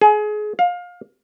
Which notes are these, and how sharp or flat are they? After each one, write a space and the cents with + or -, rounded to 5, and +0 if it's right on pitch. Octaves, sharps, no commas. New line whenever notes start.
G#4 +25
F5 +25